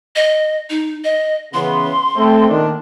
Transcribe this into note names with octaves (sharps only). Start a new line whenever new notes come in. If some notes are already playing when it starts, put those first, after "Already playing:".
D#5
D#4
D#5
C#3 E3 B3 C6
A3 C4
A#2 D#3 D4